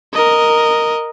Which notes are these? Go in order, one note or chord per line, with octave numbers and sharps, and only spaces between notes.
A#4 D#5